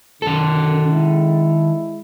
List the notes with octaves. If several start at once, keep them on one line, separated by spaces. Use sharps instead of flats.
F#2 D3 D#3 A4
G#3 E4